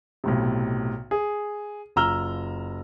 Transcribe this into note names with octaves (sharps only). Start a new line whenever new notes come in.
B1 A2 C3
G#4
F#1 F4 A#5 E6 F6 G7